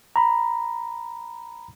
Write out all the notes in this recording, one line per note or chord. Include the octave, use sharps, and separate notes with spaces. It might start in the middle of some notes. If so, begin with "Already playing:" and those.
A#5 B5